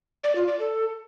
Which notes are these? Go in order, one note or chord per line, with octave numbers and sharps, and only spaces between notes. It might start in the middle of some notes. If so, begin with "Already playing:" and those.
D5
F4
D5
A4